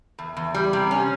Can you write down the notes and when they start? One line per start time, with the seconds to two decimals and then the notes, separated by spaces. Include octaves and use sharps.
0.19 E2
0.37 E2
0.54 G3
0.73 C3
0.91 C#4